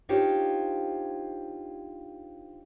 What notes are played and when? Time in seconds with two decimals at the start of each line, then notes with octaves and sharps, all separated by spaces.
0.09 D4 D#4 F4 G4 C5 C#5